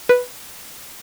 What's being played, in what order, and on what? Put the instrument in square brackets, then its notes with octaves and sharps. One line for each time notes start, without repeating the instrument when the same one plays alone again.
[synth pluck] B4